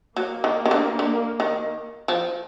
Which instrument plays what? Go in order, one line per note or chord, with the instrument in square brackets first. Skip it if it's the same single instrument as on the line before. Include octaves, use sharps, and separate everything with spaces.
[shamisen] F#3 [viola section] A#3
[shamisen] D#3
D#3
D3
D3
D#3
F3